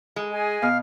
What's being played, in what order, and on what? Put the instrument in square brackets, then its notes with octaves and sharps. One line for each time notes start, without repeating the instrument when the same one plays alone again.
[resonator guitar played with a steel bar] G#3
[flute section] G#4 D#5 G#5
[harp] B2 [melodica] F5